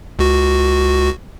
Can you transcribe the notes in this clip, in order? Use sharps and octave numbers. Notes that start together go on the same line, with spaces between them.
C#2 F#4